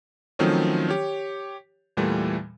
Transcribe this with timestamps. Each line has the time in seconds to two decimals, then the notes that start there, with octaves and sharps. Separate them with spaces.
0.39 D#3 F3 F#3 A3 C4 C#4
0.89 G4 C#5
1.97 E2 A#2 E3 G3 A3